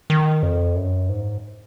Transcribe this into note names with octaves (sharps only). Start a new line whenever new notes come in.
D#3
F2
F#2
G#2